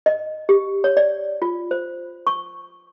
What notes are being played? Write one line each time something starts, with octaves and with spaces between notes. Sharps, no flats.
D#5
G4
C#5
D5
F4
C5
C#6